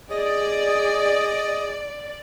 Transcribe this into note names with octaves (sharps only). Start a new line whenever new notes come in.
G#4 D5 D#5